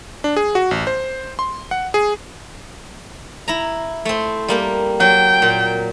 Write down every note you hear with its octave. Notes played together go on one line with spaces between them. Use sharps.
D4
G#4
F#4
A1
C5
C6
F#5
G#4
E4 A#5
A3 C4
G3 A#3 G4
F#3 G5
A#2